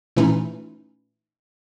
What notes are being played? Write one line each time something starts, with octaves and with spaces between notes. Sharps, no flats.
A#2 E3 A3 C#4 D#4 E4